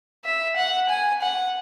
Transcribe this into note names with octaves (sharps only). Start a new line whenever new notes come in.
E5
F#5
G#5
F#5